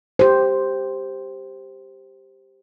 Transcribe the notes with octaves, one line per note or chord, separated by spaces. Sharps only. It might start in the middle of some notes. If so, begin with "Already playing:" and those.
G4 C5